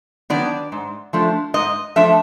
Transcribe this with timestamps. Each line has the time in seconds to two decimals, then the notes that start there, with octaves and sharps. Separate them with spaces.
0.30 D#3 F#3 B3 D4 D5
0.72 G#2
1.13 F3 A3 D4
1.54 G#2 D#5
1.96 F3 A3 D4 E5